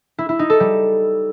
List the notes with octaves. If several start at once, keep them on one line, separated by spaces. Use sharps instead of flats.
E4
E4
D#4
A4
G3